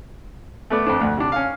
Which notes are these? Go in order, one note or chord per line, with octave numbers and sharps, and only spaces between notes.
A3 B3 D5
F2 C4 D4
D2
C3 D4
C#4 F5